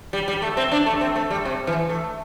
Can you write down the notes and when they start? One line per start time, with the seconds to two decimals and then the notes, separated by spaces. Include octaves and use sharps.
0.13 G3
0.28 G3
0.42 A3
0.57 C4
0.71 D4
0.86 A3
1.01 C4
1.16 A3
1.30 G3
1.45 C3
1.67 E3
1.89 A3